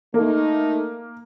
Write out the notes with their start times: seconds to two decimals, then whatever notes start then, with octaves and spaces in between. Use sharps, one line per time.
0.14 A3 A#3 D#4